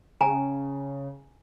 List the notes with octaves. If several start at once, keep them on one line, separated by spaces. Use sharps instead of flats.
C#3 G5 G#5 A#5